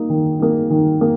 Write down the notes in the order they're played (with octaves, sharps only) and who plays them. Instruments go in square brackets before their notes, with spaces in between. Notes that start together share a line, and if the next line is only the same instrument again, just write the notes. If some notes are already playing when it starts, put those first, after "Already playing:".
Already playing: [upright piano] A#3 D#4
D#3
A#3 D#4
D#3
A#3